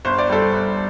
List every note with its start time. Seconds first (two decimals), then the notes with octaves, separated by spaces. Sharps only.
0.05 G1 C5
0.18 D5
0.29 G3 A4 C5
0.54 G1